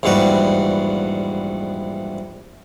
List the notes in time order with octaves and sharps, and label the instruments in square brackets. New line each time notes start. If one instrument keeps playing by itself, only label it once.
[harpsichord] A#1 E2 G#2 G3 F#4 B4